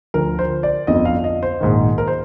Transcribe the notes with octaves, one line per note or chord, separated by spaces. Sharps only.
D2 D3 F3 A#4
C5
D5
G1 F2 D3 F3 D#5
F5
D#5
C5
A#1 G#2 D#3
A#4
C5